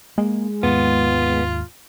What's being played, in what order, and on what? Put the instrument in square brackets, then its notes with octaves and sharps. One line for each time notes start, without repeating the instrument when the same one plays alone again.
[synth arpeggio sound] G#3 [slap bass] A#3
[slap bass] D#2 G#2 [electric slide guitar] B3 [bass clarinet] F4